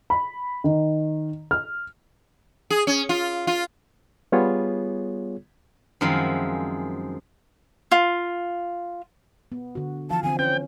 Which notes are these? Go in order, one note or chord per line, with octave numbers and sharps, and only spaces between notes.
B5
D#3
F6
G#4
C#4
F4
F4
G3 B3 F4 G#4 C#5
F#2 D#3 F3 G#3 C4 E4
F4
B3
D3 F#4
E3 F3 F5 A5
D3 C4 G#5
C#4 C5 G5